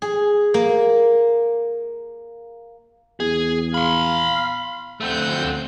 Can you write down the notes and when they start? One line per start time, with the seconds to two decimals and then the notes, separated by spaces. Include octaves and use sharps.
0.02 G#4
0.54 A#3
3.20 E2 G#4
3.74 F5 B5 C6
5.01 D2 A3 C4 F#5 G6